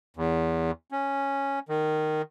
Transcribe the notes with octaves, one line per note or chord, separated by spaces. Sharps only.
E2
C#4
D#3